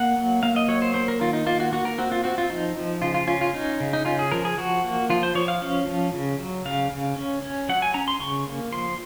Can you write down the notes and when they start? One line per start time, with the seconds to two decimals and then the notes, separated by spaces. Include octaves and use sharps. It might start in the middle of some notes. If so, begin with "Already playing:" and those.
Already playing: A#3 F#5
0.17 F#3
0.43 A#3 F5
0.56 D#5
0.68 F#3 C#5
0.82 C5
0.94 A#3 C5
1.08 A#4
1.21 D#3 F4
1.33 D#4
1.46 A#3 F4
1.60 F#4
1.73 A#3 F#4
1.85 A#4
1.98 C4 F#4
2.12 F4
2.24 C4 F#4
2.38 F4
2.50 F3 D#4
2.76 F3
3.02 C#3 F4
3.14 F4
3.27 C#4 F4
3.41 F4
3.54 C#4 D#4
3.80 C#3
3.93 D#4
4.05 C#4 F4
4.19 G#4
4.32 F3 A#4
4.45 G#4
4.58 F3 F#4
4.84 A#3
5.10 F3 F4
5.23 C5
5.35 F3 C#5
5.48 F5
5.62 C#4
5.87 F3
6.13 C#3
6.39 F#3
6.65 C#3 F5
6.91 C#3
7.16 C#4
7.42 C#4
7.69 F#3 F#5
7.82 G#5
7.94 C#4 A#5
8.08 C6
8.20 C#3 C#6
8.47 A#3
8.72 F3 C6